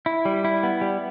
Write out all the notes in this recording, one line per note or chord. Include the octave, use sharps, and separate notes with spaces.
E4
G3
E4
B3
G3